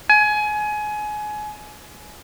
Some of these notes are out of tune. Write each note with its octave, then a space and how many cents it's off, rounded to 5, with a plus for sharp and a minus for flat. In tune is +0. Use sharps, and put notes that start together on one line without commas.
G#5 +25